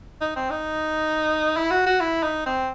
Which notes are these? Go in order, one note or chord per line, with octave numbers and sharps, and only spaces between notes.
D#4
C4
D#4
E4
F#4
F#4
E4
D#4
C4